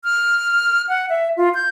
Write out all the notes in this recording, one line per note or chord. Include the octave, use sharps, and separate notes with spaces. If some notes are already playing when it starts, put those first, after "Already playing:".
F6
F#5
E5
F4
G6